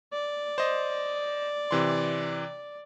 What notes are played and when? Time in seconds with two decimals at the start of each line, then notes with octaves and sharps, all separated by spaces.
0.12 D5
0.58 C5 D#5
1.71 C3 E3 C6